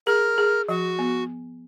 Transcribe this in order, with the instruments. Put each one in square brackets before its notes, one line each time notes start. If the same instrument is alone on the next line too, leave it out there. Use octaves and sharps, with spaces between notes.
[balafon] G#4 [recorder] A#4
[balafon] G#4
[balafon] F3 [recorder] F#4
[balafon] B3